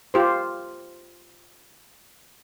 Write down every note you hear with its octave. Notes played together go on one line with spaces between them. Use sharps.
F4 G4 C5